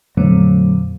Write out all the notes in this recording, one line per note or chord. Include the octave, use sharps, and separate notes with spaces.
F2 A#2 D3 F#3 A3 C4